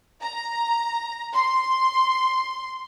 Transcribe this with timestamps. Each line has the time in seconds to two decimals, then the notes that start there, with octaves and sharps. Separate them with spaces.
0.21 A#5
1.33 C6